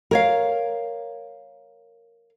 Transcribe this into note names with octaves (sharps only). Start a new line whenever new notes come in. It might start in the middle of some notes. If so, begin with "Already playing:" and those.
A#4 C#5 F5